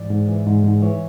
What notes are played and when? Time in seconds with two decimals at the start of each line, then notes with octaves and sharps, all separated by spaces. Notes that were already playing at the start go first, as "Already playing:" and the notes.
Already playing: G#2 E3 D5
0.11 G#2
0.29 E3
0.47 G#2
0.64 G#2
0.83 E3 C#5